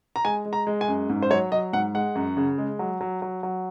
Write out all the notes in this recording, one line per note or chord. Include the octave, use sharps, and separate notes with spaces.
A#5
G#3 G#5
G#3
A#5
G#3
G#5
F#2
G#2
C5
F#3 C#5
F#3 D#5
G#2 F#5
G#3 F#5
F#2
C#3
G#3
F#3
F#3
F#3
F#3